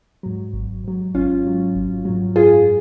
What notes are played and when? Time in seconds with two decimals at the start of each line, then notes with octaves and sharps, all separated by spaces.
0.23 G#2 F#3
0.54 G#1
0.84 G#2 F#3
1.15 G#1 C#4 F4
1.45 G#2 F#3
1.75 G#1
2.05 G#2 F#3
2.36 F#2 F4 G#4